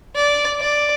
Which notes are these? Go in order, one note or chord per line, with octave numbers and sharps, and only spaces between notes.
D5
D5